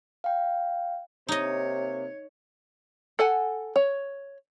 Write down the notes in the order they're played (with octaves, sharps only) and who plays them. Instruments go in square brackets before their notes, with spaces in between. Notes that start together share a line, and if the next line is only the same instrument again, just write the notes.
[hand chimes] F5 G5
[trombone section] C3 A#3 [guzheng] D#4 D#5 [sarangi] C#5
[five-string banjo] A4 F#5 G#5
C#5